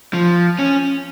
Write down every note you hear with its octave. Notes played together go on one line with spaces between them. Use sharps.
F3
C#4